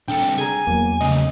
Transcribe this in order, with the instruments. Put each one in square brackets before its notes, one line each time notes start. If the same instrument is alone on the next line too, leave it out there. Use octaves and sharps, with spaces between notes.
[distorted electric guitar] C2 A4 [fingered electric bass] D4 [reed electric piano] G5
[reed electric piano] G#4 A#5 [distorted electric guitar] G#5
[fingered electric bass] E2 F#3 [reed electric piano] A#3
[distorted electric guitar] C#3 A3 [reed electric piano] D#5